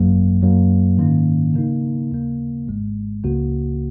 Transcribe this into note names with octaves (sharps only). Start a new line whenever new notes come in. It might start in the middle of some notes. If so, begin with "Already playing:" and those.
Already playing: G#1 F#2 F#3 A#3
F#2 F#3 A#3
G#2 D#3 A#3 C#4
C#3 A#3 D#4
D#2 C#3 A#3
G#1 G#2 G#3
C#2 C#3 A#3 F#4